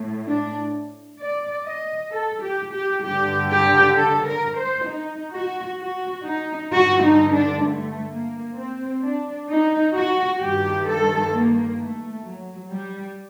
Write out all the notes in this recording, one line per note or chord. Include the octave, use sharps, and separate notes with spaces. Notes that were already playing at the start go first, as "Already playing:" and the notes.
Already playing: A2
D4
D5
D#5
A4
G4
G4
G2 D3 G4
G4
A4
A#4
C5
D#4
F#4
F#4
D#4
G2 D3 F#4
D#4
D4
A3
A#3
C4
D4
D#4
F#4
G2 D#3 G4
A4
A#3
A3
F#3
G3